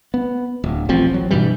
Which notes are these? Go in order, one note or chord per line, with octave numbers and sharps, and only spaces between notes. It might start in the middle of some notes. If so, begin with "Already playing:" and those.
B3
D1
D#1 A1 F3 C4
A1 F#3
G2 B2 E3 G3